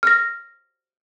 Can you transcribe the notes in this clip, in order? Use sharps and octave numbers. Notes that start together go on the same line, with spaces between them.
F6 A#6